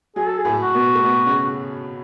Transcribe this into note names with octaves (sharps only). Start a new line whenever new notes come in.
F#3 G#4
A4
G#4
A2 A3
F#4
B2 B3
A3
B2 B3
C#3 C#4